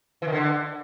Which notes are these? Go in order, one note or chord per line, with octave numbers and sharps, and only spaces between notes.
E3
D#3
D3